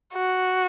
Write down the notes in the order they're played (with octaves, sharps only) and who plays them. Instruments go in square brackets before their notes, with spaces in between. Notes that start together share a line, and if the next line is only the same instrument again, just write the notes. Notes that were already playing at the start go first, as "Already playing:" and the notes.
[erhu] F#4